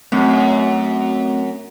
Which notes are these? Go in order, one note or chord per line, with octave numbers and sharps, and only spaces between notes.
F#2 A3 C4